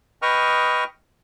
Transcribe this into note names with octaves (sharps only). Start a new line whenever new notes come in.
B4 D#5 G5 C#6 D#6 F6